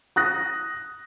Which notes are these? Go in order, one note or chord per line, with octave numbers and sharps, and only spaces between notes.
D#6 F#6 A#6